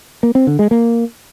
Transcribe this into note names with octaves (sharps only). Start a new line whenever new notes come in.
A#3
C4
D3
G#3
A#3